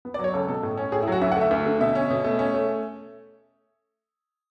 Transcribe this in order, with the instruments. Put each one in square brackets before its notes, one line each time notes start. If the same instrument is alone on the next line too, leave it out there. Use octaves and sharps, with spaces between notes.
[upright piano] B3
D5
F#3
C#5
C#2 A4
B2 A4
A2
C#4
A2 G#4
E4
F#3 F#4
D2 E5
F#5
A3 E5
D2 E5
D3
B2 E5
C#4
B2
A3
C#4
A3